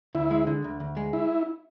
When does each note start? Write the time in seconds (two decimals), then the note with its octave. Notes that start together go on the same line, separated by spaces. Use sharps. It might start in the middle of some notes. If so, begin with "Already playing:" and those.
0.15 D2 E4
0.31 G#3
0.47 D3
0.64 D2
0.80 D2
0.97 G#3
1.13 E4